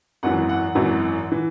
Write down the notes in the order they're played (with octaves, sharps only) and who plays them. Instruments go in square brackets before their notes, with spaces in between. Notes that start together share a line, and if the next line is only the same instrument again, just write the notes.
[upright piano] G#1 F#2 E3 F#5
F#5
G#1 F#2 E3
E3